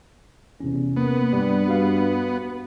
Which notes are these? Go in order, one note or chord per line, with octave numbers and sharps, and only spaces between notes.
E2 C3 C#4
A#3 B3
G2 G3
F#4 F5